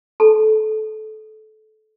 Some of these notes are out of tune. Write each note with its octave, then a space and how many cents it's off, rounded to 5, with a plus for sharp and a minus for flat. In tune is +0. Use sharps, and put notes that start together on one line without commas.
A4 -20 A5 -15